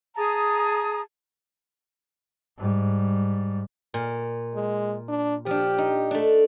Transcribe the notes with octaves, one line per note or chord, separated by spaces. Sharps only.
G#4 A5 A#5 D#6
G#2 G3
A#2
G#3
D4
F3 D4 G4
D#4
A3 D4